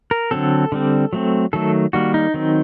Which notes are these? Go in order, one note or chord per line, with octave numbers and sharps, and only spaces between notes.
A#4
D3 F#3 C4 A4
D3 G3 C4
F#3 A3 C4
D#3 F#3 A3 A4
D#3 G3 A#3 F#4
D#4
D#3 F#3 C4